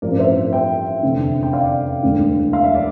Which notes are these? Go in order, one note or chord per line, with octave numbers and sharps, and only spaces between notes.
A1 G2 F3 C4 A#4 D5
C5 E5
E5 G5
F1 E2 D3
G5
D5 F5
E1 D2 D3
F5
E5
D5